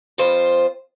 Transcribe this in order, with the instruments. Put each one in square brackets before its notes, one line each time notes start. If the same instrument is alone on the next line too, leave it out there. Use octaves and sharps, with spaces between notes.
[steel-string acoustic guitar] F2 F4 C5